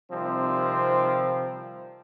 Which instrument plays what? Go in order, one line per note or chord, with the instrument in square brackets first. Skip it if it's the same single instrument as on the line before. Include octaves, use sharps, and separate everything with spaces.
[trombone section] C3 D#3 F3 G3 C4